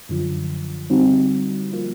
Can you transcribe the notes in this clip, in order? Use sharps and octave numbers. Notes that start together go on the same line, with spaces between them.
F#2 D3 F3
D3 G3 C4 D#4 F#4
F3 A#3